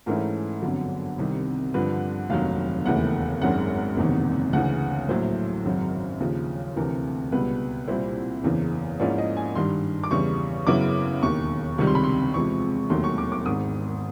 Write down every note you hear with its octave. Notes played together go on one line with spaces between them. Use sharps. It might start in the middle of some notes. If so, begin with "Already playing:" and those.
G#2 E3 A3 C#4 E4 A#4
G1 F2 D3 F#3
C2 C3 D#3 G3
G2 D3 F3 B4
F1 D#2 D#3 F#3 F5
E1 D#2 C#3 E3 A3 F#5
G#1 F#2 D#3 G#3 F#5
F#1 E2 C3 D#3
D2 C#3 E3 F#5
A#1 A2 F#3 C5
G#1 F#2 C#3 F#3
D#2 C#3 F3
D2 C3 E3 A3 A#4
C#2 B2 G3 B3 B4
C2 A#2 G3 C4 E4 C5
F#1 E2 C#3 E3
G#2 F3 A#3 C#4 E4 D5
D#5
G#5
G2 D#3 G3 C6
D6
E2 C#3 E3 G3 C#6
F#2 C#3 F#3 B3 E4 D6
E1 D#2 D#3 C#6
C#2 C3 D#3 G3 C#6
C6
B5
C6
E2 C3 F3 G#3 C#6
E1 D#2 D#3 F#3 A3 C6
C#6
D6
D6
G#1 G#2 D#3 D#6